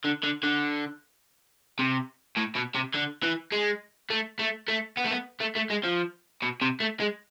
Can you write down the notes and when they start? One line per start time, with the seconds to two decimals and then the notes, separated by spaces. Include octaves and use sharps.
0.05 D3
0.24 D3
0.43 D3
1.79 C3
2.37 A2
2.56 B2
2.75 C3
2.95 D3
3.23 E3
3.52 G#3
4.10 A3
4.39 A3
4.68 A3
4.97 B3
5.04 A3
5.11 B3
5.40 A3
5.55 A3
5.70 G#3
5.84 F3
6.42 B2
6.62 C3
6.80 A3
7.00 G#3